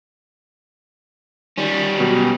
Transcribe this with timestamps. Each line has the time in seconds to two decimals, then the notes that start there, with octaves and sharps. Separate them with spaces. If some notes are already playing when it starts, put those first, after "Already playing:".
1.57 D#3 G3 C#4
1.98 B2 F#3